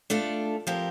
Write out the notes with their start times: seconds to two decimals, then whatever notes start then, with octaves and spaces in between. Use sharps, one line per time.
0.10 A3 D4 F4 A4
0.67 F3 C4 G4 A#4